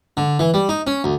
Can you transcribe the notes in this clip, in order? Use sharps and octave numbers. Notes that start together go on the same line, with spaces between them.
D3
E3
G3
D#4
C#4
D2